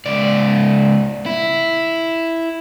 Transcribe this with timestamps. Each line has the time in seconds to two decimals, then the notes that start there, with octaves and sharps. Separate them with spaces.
0.06 C#2 D5
1.26 E4